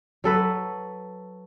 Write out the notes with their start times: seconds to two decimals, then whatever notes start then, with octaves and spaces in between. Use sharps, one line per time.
0.24 F#3 A4 B4